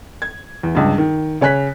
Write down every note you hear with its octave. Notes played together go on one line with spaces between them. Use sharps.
G#6
E2
C#2 G2
D#3
C#3 C#5 G#5 F#6 B6